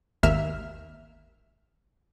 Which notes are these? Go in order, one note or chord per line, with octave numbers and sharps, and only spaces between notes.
G#1 D#2 A#3 E5 F6